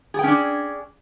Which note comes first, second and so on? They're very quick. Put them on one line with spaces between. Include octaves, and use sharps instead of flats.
G#4 G5 C#4 D4